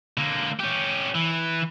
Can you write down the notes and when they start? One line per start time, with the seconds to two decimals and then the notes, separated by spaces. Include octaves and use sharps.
0.17 D3 A#3
0.59 C#4 G4
1.15 E3